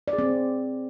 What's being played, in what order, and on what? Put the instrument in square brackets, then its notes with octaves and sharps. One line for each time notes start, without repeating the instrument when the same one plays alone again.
[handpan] D5
G#4
C4